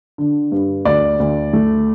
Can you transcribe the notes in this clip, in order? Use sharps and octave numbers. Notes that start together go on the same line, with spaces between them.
D3
G2
D2 D5
D2
A3